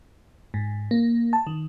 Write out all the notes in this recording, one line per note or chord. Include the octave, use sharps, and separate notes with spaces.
G#2
A#3
A5
D#3